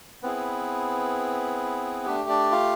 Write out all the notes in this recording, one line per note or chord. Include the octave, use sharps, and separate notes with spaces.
B3 C4 E4 G#4 B4
A3 D4 G4
D4 D5
F4 F5